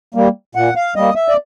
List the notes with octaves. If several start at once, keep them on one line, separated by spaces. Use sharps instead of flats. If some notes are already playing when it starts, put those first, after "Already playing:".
G3 A#3
A#2 F#5
F5
G3 A#3 D#5
E5
D5